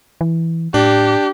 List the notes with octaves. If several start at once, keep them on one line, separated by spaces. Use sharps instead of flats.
E3
A2 D4 G4